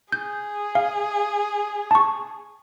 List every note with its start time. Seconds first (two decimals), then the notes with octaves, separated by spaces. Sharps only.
0.12 G#4 G6
0.75 F5
1.91 A5 C#6